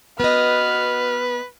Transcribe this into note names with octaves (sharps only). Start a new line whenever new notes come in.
B3 F#4 B4 D#5 F6